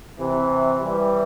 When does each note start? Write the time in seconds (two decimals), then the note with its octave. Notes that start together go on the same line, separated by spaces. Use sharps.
0.19 C3 E3
0.83 E3 G3